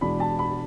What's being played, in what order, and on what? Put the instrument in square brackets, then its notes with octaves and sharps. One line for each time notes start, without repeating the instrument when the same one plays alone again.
[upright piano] E2 B2 G#3 D4 B5
A5
B5